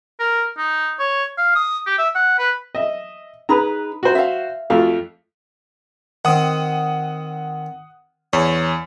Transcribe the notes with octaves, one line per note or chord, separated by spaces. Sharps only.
A#4
D#4
C#5
F5
D#6
G4
E5
F#5
B4
D#5 E5
D#4 G#4 B4 A#5 B5
F#4 C5
E5 F5
F2 A3 F#4 F5
D#3 C4 F#5 D#6
E2 C#5